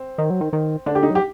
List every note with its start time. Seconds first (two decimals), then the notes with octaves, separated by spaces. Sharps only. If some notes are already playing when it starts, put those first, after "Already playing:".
Already playing: C4
0.18 D#3
0.30 F#3
0.41 D#3
0.53 D#3
0.86 D3 D4
0.95 G4
1.03 D#4
1.10 F#3
1.15 G4